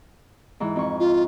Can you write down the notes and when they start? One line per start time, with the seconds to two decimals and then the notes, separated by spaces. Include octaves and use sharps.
0.60 G#2 E3
0.76 F2 C#6
1.00 F4